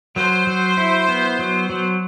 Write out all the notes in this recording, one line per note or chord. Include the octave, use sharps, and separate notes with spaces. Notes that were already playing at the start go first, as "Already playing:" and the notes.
F#3 C5
F#3
E4
B3
F#3
F#3